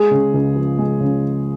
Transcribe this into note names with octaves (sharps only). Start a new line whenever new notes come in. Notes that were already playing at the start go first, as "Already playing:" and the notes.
Already playing: G#3 G#4
C#3
C#2
F3
G#3
C#3